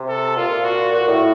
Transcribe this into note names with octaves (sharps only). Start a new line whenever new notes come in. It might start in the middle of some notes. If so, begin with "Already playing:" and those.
Already playing: C3
A4
A#2 F4
F#4
A#2 F#4
A2